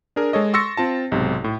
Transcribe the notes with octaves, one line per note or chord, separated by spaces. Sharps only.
D4 G#4 A#4
G#3 A4 C#5 D#5
C6 C#6 E6 A6 A#6 C#7
C4 F4 A5
B1 G#2 C3
A2